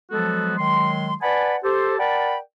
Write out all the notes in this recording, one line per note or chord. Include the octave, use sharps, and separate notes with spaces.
F3 F#3 G#3 B3 F#4 A4
D#3 F#3 G#3 C6
B4 D5 F#5 G#5 A5 B5
G4 A4 C5
A#4 D5 F#5 G5 A5 B5